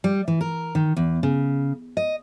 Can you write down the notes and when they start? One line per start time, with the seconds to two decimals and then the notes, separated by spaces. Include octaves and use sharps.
0.04 G3
0.28 E3
0.41 A#4
0.75 D#3
0.97 E2
1.23 C#3
1.97 D#5